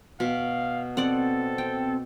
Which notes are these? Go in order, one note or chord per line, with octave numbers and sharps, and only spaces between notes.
B2 F5
C4 A4 D5 F#5
G5